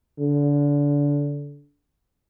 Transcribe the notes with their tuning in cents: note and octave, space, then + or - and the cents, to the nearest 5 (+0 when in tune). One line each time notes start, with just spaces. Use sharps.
D3 -25